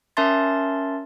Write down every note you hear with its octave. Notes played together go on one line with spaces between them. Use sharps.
C#4 A#4 E5 A5 C6 A6